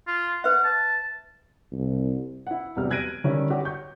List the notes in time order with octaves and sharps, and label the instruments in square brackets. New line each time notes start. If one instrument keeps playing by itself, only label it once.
[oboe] F4
[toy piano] B4 E5 [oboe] F#5
[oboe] A5
[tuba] C2
[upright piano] E4 F#5
E1 C3 F#3 G3 F6
F#6 G#6 A#6 D7 D#7
D3 D#3 G3 C#4 E4
F#4 G4 C#5 F#5
C#6 G6